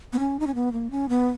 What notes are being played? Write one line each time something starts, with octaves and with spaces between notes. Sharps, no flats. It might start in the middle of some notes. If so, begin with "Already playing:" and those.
B3
C#4
D#4
C#4
B3
A#3
C#4
B3